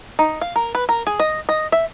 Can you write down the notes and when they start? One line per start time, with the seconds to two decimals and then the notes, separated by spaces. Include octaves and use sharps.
0.19 D#4
0.41 F5
0.56 A#4
0.75 B4
0.89 A#4
1.07 G#4
1.20 D#5
1.49 D#5
1.72 E5